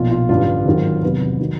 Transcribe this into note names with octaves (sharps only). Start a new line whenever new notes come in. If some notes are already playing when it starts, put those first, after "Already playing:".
Already playing: B1 A#2 F3 F4
F4
A1 G2 D3 F4
G#1 G#2 D#3 F#3
F1 E2 C3 D#3 F#3 B4
D#3 F#3